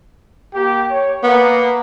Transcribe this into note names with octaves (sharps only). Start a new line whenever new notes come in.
A#3 G4
C#5
A#3 B3